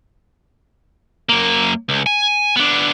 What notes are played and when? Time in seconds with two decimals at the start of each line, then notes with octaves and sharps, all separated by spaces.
1.29 F#2 A#3
1.89 C#2
2.06 G#5
2.56 B3 D4